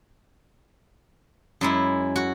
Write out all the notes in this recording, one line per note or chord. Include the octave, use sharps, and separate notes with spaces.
F#2 G#3 E4
F#4